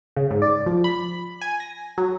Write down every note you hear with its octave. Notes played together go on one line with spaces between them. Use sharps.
C#3
G#2
D5
F3
B5
G#5
A#6
F#3